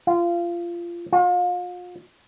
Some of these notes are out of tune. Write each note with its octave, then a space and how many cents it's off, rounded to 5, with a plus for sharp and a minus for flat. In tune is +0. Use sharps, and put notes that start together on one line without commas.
F4 -20
F4 +40